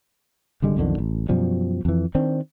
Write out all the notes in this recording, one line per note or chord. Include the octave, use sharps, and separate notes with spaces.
G#1 D3 G3 G#3
B1 F2 D3 D#3
A1
F#2 B2 F3 G3
F2 E3
D#3 C4 D4